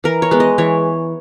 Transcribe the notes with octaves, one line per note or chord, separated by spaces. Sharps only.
E3 A#4
C#5
G#3 B3
D#5
E3 C#5